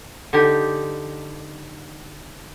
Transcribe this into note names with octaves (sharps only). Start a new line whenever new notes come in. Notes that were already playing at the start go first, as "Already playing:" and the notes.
D3 D#4 G4